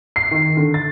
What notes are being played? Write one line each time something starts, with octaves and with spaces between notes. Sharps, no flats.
C7
D#3
D3
A6